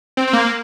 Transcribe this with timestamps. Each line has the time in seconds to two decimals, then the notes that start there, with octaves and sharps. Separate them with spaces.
0.17 C4
0.27 C4
0.33 A#3